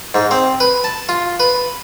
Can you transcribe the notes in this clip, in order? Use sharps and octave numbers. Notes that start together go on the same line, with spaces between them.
G#2
C4
B4
A5
F4
B4